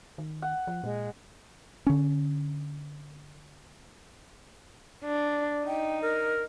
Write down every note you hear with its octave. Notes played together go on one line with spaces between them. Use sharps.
D#3
F#5
F3
A#2 G#3
D3 C#4
D4
D#4 G5
A#4